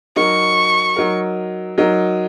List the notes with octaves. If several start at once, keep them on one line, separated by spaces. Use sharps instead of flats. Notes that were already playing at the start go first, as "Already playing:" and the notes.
F#3 D#4 A#4 C#6
F#3 D#4 A#4
F#3 D#4 A#4